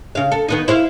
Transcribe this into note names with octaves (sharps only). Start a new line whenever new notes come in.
C#3 F5
A4
D#3 B3 D#4
E4 C5 F5